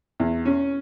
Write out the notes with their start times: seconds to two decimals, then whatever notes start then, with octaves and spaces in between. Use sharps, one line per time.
0.20 E2
0.45 C#4